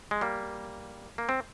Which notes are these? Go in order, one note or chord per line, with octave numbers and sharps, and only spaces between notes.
G#3
G3 A#3
A#3
C4